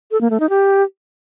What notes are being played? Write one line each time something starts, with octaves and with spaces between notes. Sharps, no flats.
A4
A#3
A3
D#4
G4